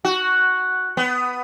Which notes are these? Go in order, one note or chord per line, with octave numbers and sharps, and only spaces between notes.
F#4
B3